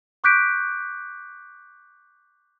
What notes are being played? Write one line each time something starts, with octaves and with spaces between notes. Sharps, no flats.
C#6 D6 F#6 G6 B6 D7